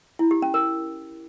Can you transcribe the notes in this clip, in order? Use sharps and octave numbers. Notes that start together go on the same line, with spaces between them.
E4
G4
C#4
A#4